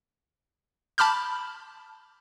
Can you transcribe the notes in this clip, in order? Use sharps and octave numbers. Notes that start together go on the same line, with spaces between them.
A5 B5 D6 F6 G6